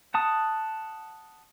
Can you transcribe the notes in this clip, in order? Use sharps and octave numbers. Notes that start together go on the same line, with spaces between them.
F#5 A5 D#6